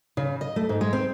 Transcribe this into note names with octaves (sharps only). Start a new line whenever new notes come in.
C#3
D#5
A3
G#2
G#3
C4